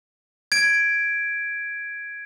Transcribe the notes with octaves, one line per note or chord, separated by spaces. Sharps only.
G#6 D7